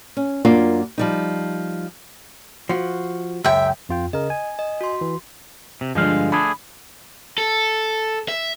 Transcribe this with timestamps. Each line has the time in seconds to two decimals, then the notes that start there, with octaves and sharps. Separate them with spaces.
0.17 C#4
0.45 F#2 A#3 D4 F4
0.98 F3 G3 D#4
2.69 F3 F#4
3.45 C#2 F#2 E5 G5
3.89 F2 F4 G5
4.13 C#3 A#4 D#5
4.30 G#5
4.59 D#5
4.81 F#4 C6
5.01 E3
5.81 C3
5.95 G2 D3 F3 G#3 F5
6.32 A3 D4 G#4 B5
7.38 A4
8.28 E5